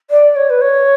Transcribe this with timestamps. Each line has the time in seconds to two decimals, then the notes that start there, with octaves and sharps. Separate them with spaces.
0.11 D5
0.36 C#5
0.50 B4
0.61 C#5